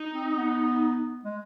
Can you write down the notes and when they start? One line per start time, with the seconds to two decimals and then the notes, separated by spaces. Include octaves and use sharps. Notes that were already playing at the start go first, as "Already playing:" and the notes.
Already playing: D#4
0.12 C4
0.36 B3
1.25 G#3